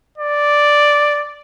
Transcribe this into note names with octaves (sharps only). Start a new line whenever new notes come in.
D5